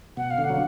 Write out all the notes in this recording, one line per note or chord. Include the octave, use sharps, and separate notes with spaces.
B2 F#5
F5
B2 D3
F#5
F#3